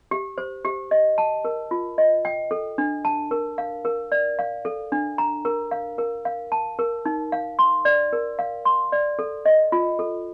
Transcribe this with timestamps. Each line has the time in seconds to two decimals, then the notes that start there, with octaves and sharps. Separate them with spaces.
0.11 G4
0.38 C5
0.65 G4
0.91 D#5
1.18 A5
1.45 A#4
1.71 F4
1.98 D#5
2.25 G5
2.51 A4
2.78 D4
3.05 A5
3.31 A#4
3.58 F5
3.85 A#4
4.12 D5
4.39 F5
4.65 A4
4.92 D4
5.18 A#5
5.45 A#4
5.71 F5
5.98 A#4
6.25 F5
6.52 A5
6.79 A#4
7.06 D#4
7.32 F5
7.59 C6
7.85 D5
8.13 A#4
8.39 F5
8.65 C6
8.92 D5
9.19 A4
9.46 D#5
9.72 F4
9.99 A4